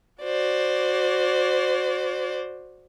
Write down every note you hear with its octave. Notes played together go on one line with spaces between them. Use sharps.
F#4 C5 D5